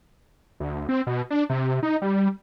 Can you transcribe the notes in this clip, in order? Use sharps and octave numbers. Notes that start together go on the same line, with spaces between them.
D2
C4
B2
D4
C3
D#4
G3